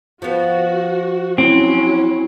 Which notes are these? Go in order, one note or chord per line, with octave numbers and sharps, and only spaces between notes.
F3 B3 F#4
F#3 C4 C#4 E4